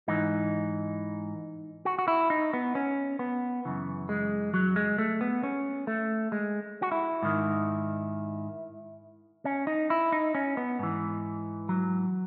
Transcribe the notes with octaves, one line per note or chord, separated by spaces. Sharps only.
G#2 E3 D#4
F#4
F#4
E4
D#4
B3
C#4
B3
F#2 C#3 E3
G#3
F#3
G#3
A3
B3
C#4
A3
G#3
F#4
E4
G#2 D#3
C#4
D#4
E4
D#4
C#4
B3
G#2 E3
F#3